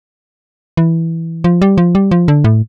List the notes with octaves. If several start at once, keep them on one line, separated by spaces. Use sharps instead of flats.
E3
F3
G3
F3
G3
F3
D3
A2